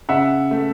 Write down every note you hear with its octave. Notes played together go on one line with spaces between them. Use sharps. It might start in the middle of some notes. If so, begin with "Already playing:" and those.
C#3 E5 F#5
A3